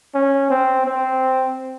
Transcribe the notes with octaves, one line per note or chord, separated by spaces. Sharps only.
C#4
C4
C4